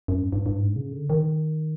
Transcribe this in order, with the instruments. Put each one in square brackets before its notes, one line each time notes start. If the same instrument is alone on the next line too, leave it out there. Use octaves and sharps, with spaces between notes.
[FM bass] F#2
G2
G2
G2
G#2
C#3
D3
D#3